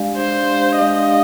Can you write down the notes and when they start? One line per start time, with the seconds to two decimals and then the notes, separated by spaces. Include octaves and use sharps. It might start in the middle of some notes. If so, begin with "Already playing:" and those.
Already playing: G#3 D4 G4 D5 F5
0.17 G#3 D4 G4 C5 D5 F5
0.78 G#3 D4 G4 D5 D#5 F5